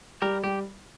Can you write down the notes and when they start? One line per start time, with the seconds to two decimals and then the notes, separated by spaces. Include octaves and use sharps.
0.22 G3 G4 A#4
0.44 G3 G4